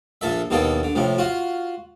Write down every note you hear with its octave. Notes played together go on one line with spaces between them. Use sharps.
A#1 A#2 A4 E5
D#2 B2 D3 A#3 A4
D3
A2 C3 F3
F4 F#4